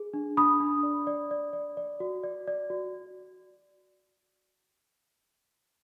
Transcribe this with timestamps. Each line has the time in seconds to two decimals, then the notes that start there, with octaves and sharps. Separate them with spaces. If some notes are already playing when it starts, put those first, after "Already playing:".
Already playing: G#4
0.14 D4
0.37 D4 B5 D#6
0.60 D4
0.83 D5
1.07 D5
1.31 D5
1.53 D5
1.77 D5
2.00 F#4
2.24 D5
2.47 D5
2.70 F#4